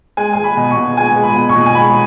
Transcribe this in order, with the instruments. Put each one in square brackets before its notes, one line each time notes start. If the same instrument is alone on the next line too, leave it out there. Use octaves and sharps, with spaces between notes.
[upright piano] G#3 G#5
G#3 G#5
B5
B2
C#6
B2
G#3 G#5
G#3
B5
B2
C#6
B2
G#5
G#3 B5